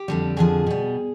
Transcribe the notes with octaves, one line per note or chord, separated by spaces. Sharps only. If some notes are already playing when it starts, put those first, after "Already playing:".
Already playing: G4
F2 D3 G3
F2 D3 F3 G#4
B2 G3